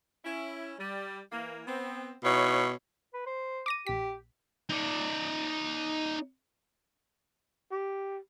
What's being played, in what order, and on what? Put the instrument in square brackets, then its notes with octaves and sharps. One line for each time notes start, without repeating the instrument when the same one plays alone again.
[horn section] C#4 E4
G3
E3 A#3
B3 C4
[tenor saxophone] B2 [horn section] D#4 E4 C#5
[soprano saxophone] B4
C5
[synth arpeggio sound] D6 A#6 D#7
[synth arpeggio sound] A#1 B6 [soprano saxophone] G4
[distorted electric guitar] D#4 D5
[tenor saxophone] G4